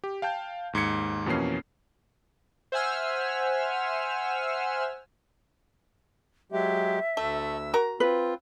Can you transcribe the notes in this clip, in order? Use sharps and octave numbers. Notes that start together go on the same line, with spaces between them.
G4
F5 G5 A5 G6
D#2 G#2 G#6 C#7
F2 B2 E3 A#3 C#4 C7
C5 E5 F#5 G#5 E6 F6
F#3 G#3 G4 E5
D2 A3 E6
F#4 A#4 A#5
C4 F4 B4